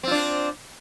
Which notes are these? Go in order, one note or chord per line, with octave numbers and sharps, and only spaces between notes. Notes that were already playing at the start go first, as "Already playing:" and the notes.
C4 D4 F4